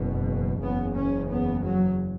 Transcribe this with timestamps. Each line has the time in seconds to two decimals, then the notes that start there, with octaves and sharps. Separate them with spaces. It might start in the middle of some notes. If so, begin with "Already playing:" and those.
Already playing: F#1 E2 B2
0.62 F#1 E2 C#3 B3
0.97 C#4
1.31 B3
1.65 F#3